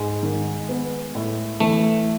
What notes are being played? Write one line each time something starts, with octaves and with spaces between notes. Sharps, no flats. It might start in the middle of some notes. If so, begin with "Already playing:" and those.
Already playing: G#2 G#3
D#3
B3
A2
E3 A3